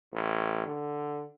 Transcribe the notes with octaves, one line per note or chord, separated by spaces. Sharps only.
A1
D3